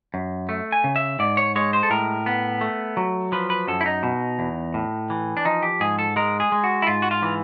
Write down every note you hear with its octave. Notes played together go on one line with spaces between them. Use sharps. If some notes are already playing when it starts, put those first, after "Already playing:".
F#2
A3
G#5
C#3
E5
G#2 D5
C#5
G#3 C#5
C5
A4
A2 A#4
B3
A3
F#3
F3 B4
B4
F#2 A4
E4
D#4
B2
E2
A2
E3
D4
F3 D#4
G4
G#2 G#4
A4
G#3 A#4
G#4
G#3
F#4
E4
G#2 F4
F#4
F4
E3